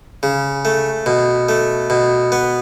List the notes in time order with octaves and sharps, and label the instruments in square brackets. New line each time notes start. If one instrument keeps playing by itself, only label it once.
[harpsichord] C#3
A3
B2
A3
B2
B3